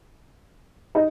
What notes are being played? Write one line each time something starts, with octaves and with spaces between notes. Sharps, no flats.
D#4